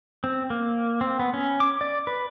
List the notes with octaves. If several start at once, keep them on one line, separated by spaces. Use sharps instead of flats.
C4
A#3
C4
B3
C#4
D6
D5
B4